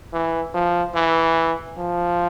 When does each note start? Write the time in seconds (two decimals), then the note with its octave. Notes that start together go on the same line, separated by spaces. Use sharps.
0.13 E3
0.54 F3
0.95 E3
1.78 F3